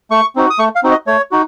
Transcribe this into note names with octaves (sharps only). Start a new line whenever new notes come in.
A3 C#6
C4 D#4 F#4
D#6
A3 C#6
F5
C4 D#4 F#4
D#5
A3 C#5
D#4 F#4